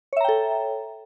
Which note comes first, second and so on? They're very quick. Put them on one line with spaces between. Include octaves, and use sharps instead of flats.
C#5 E5 A#5 G5 A4